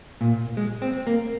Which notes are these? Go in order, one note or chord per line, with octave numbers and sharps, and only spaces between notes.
A#2
G#3
C4
A#3